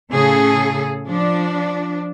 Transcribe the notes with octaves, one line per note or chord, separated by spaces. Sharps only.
A2 C#3 G#4 A4
F3 D4